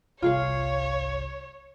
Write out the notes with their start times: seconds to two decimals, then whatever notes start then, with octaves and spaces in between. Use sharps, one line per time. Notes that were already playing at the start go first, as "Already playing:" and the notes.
0.22 G1 C2 F4 G#4 C#5 F5